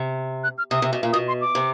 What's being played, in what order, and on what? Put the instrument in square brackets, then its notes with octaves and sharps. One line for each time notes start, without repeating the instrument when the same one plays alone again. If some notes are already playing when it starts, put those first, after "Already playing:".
Already playing: [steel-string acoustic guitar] C3
[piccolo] F#6
F6
[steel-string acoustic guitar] C3 [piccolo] D#6
[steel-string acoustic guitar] C3
B2
A#2
[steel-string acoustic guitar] B2 [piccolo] D#6
[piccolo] C6
D6
[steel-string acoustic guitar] C3